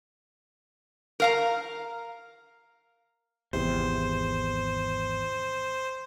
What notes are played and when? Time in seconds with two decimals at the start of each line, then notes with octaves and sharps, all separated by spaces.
1.20 A#4 F5 A#5
3.53 G#1 E2 C3 C5